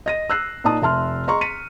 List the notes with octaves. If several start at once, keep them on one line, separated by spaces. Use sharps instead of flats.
D#5 A#6 D#7
E6 F#6 C7
A#2 D#4 D5 A5 D#6
F1 E5 A5 C6 F6
G#4 D#5 A#5 C6 C#6
B6 C#7 D#7